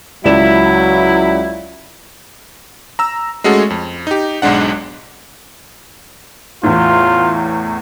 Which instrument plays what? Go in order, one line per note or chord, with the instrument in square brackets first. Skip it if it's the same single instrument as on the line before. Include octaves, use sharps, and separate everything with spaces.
[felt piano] C#2 D5 E7 [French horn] F#3 [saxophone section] E4
[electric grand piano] A#5 E6
G#3 A3 C#4 F#4 G#4 A4
F2
D#4 G4
B1 G#2 G#3 D4 F#5
[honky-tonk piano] E2 A2 [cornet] F4